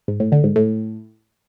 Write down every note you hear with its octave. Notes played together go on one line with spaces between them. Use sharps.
G#2
A2
D3
G#2
A2